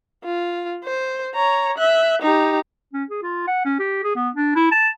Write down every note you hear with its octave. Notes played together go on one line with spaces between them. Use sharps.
F4
C5
C#5 A#5
E5 F#6
D#4 G4
C#4
G#4
F4
F#5
C#4
G4
G#4
B3
D4
E4
A5